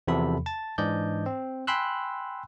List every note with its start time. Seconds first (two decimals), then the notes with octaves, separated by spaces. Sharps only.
0.07 E2 C3 F3 B3 A4 B5
0.46 A5 A6
0.78 G#2 E3 D4 D5 D#5 G6
1.26 C4
1.67 G5 G#5 B5 C6 E6 F#6